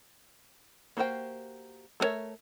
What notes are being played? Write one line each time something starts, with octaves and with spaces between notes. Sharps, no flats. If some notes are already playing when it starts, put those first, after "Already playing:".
A#3 F#4 G4 C5 G5
A3 G#4 A#4 C#5 E5